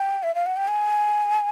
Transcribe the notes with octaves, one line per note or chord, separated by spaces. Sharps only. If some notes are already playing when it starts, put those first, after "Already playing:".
Already playing: G5
E5
F5
F#5
G5
G#5